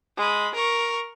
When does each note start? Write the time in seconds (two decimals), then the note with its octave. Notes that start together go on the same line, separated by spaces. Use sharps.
0.17 G#3 B5
0.54 A#4 C#6